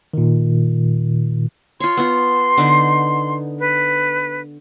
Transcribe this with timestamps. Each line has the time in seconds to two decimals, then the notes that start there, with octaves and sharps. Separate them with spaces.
0.13 A#2 D#3
1.80 F4 C#5 C6
1.97 B3 F4
2.58 D3 B3 D#4
3.59 B4